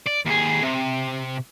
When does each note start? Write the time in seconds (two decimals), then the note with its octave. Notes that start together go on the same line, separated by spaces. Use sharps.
0.07 D5
0.26 D#2 G#4
0.63 C3